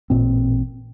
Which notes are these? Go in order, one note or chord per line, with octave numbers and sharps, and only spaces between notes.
A1 A#2 C4